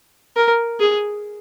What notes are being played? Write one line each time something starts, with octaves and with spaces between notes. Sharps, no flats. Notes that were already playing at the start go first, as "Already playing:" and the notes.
A#4
G#4